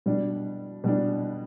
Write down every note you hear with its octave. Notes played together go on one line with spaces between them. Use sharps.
B2 G3 D4
B2 G3 D4